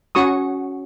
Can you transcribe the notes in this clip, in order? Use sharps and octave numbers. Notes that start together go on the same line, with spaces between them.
C#4 F#4 C#6 D#6